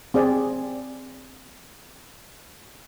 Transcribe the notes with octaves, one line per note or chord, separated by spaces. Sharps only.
C4 G#4 D5